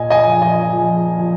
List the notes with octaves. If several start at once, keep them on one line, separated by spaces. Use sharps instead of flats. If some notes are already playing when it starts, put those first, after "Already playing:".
Already playing: A#2 D#5 G#5
D#5 G#5
F3
D#5 G#5
F3
F3